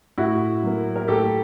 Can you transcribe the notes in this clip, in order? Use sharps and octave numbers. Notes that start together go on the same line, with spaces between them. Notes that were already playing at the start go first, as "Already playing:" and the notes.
A2 E4 F#4
F#3 A#3
A#4
A2 G4 A4